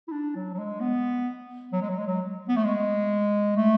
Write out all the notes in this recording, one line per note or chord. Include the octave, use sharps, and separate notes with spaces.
E4
D4
F#3
F#3
G#3
B3
F#3
G#3
F#3
G#3
F#3
B3
A3
G#3
A3